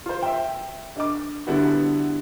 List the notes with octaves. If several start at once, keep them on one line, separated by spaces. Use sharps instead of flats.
F4 C5
E5 G5
D4 D#5 D6
D3 G3 B3 D4 E4 F#4